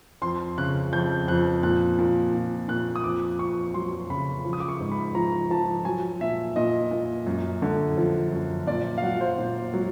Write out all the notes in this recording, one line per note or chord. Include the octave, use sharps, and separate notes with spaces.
F2 C6
C#3 F#6
F2 G6
F2 F#6
A#2 F#6
A#2
A#2
A#2 F#6
D#6
F2 D6
F2 C#6
F#3 C6
C#3 B5
F3
D#6
D6
C#6
G#2
B5
F3 A#5
F3 A5
F#3 G#5
A#2 E5
A#2 D#5
A#2
F#2
D3
F3
F#2
A#2 D5
F5
F#3 F#5
C5
A#2
F#3